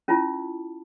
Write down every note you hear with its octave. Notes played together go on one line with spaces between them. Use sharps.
C#4 E4 F4 A5